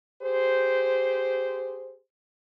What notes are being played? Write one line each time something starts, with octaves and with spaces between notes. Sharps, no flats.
G4 G#4 C5